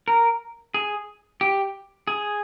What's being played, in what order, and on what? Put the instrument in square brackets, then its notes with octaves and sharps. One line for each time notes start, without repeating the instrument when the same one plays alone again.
[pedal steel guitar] A#4
G#4
G4
G#4